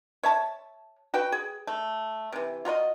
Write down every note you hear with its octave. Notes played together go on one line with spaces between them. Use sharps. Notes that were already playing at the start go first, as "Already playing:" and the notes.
C#5 E5 A5
F#4 B4 G5
G#4
A3
C3 E3
F4 F#4 A#4 D#5